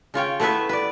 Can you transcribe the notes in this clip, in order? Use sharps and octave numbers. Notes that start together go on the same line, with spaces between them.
C#3 F4 C#5 G5
A3 B3 E4 A4 B4 E5
B4 D5